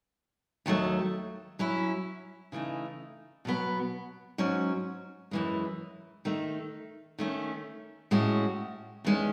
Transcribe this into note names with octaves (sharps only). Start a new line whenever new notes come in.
D#2 D#3 F#3 A3
F#3 C#4 E4
C#3 E3 A3 D#4
B2 F#3 B3
G#2 F#3 C#4
F#2 E3 G#3
D#3 A3 D#4
D#3 A3 C#4
A2 G#3 C#4 F#4
E2 D#3 G#3 C#4